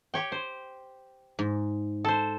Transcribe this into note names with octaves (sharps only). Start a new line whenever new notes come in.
G4 C#5 G5
C5
G#2
A4 C5